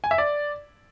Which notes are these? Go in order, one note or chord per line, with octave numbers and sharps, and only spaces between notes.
G#5
E5
D5